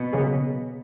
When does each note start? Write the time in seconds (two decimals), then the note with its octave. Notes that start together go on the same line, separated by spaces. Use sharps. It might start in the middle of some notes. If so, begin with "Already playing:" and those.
Already playing: B2
0.13 C#3 F#3 A#3 C#4 G#4